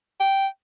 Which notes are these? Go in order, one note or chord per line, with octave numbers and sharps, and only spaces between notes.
G5